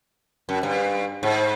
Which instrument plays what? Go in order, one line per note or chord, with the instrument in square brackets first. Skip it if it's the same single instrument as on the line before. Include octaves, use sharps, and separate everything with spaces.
[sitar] F#2
G2
G#2